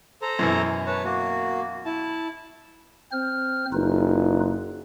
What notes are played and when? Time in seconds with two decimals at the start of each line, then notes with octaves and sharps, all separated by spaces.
0.22 A4 C5 A#5
0.39 F#2 B2 E3
0.87 B4 C#5 A5
1.05 A#3 F#4
1.85 E4 A5
3.12 C4 C5 F6
3.72 F#1 D#4 F4 B4